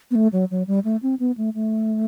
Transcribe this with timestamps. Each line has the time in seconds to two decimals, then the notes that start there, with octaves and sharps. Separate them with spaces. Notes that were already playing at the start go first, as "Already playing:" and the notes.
0.11 B3
0.15 A3
0.33 F#3
0.51 F#3
0.67 G3
0.84 A3
1.03 C4
1.20 B3
1.38 A3
1.54 A3